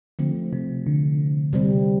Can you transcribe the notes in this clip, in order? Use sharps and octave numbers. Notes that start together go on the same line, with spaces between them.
D3 F3 A3 C4
C3
D3
C3 G3 C4